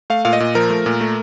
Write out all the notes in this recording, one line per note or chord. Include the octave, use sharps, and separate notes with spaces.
A3 F5
A#2 F5
D#5
A#2
F3 A#4
A3
A#2
A3